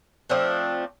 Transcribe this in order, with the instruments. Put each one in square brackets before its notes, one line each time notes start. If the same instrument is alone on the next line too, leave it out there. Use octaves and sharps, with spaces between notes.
[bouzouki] F3 A3 C4 D4